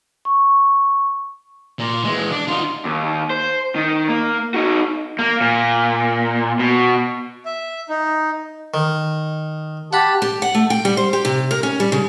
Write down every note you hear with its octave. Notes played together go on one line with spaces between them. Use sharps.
C#6
A#2
E3 G#3
D4
D#4 F4
D#2
C5
D#3
A#3
D#4 F#4
A#3
A#2
B2
E5
D#4
D#3
G4 F#5 A5 B5
G4
F#5
A3
G5
G3
C5
G4
C3
A#4
C#4
G3
C#3